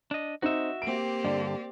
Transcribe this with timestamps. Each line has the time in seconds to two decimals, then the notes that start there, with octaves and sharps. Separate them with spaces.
0.11 D4 D#5
0.42 C4 D#4 F#4 E5
0.82 A#3 C4 G4 D7
1.25 G2 D3 D5